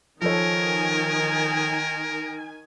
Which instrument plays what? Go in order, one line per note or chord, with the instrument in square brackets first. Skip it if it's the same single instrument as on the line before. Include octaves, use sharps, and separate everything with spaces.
[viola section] D#3 G#5 [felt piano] F3 A4 C#5 [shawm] A#4